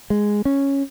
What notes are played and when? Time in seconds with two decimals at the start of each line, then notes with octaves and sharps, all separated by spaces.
0.10 G#3
0.45 C#4